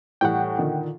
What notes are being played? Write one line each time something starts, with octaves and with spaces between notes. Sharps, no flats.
A2 E3 G3 F#5 G5
A#2 D3 D#3